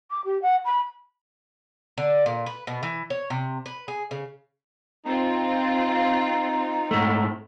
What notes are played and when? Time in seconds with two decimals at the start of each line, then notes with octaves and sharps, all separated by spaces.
0.11 D6
0.25 G4
0.42 F#5
0.65 B5
1.98 D3
2.26 A#2
2.46 B4
2.67 B2
2.83 E3
3.10 C#5
3.30 C3
3.66 B4
3.88 G#4
4.11 C#3
5.05 C4 D#4 F4
6.91 G#2 A3